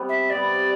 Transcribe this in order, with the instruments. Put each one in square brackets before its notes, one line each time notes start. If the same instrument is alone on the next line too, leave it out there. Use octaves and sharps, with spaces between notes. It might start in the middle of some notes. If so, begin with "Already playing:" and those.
Already playing: [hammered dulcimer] C3 G3 B3
[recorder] E5
[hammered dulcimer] C3 G3 B3 [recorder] D5